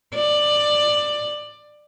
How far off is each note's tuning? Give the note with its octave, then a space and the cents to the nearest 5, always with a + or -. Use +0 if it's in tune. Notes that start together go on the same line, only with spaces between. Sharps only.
D5 +15